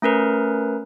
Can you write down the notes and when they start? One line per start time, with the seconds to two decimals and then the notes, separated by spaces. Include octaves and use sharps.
0.02 A3 C#4 A#4 B4